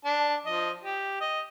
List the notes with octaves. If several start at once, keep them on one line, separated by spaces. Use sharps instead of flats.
D4 A5
F3 D#5
G4
D#5